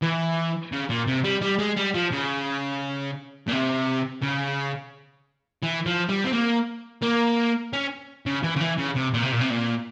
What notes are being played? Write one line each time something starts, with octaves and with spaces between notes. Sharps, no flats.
E3
C#3
A#2
C3
G3
G3
G#3
G3
F3
C#3
A#2
C3
C#3
E3
F3
G3
C4
A#3
A#3
C#4
C#3
E3
C#3
E3
C#3
C3
A#2
C3
A#2
C3
A#2